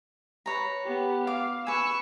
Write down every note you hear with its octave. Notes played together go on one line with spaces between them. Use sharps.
B4 C#5 A#5
B3 G4
F5 D6
B4 G#5 C#6 E6